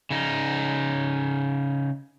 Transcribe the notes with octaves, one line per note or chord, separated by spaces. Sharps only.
C#3 D#4